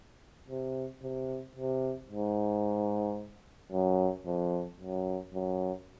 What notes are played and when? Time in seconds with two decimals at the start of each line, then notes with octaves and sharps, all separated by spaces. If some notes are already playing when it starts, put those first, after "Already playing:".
0.48 C3
1.02 C3
1.56 C3
2.10 G#2
3.72 F#2
4.26 F2
4.80 F#2
5.34 F#2